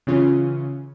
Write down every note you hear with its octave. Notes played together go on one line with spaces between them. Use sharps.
C#3 E3 C#4 F4